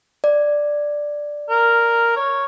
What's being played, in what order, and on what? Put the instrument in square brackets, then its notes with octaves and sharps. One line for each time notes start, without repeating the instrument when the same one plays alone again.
[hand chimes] D5
[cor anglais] A#4
C#5